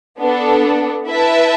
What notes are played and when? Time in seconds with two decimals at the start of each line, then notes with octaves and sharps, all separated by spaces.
0.20 B3 D4 A4
1.08 E4 B4 E5 A5